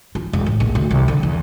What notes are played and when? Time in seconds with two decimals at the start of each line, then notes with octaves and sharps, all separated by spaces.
0.15 F3
0.33 E1
0.46 A1
0.60 A#1
0.75 D2
0.91 C2
1.08 D3
1.23 E2